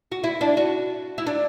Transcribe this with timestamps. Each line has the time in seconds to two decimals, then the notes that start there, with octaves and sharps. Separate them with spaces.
0.12 F#4
0.24 E4
0.41 D4
0.57 F#4
1.18 E4
1.26 D4